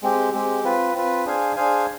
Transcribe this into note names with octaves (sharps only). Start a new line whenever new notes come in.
G#3 C4 G4
G#3 C4 G4
C4 F4 B4
C4 F4 B4
D4 G#4 C5 F5 G#5
D4 G#4 C5 F5 G#5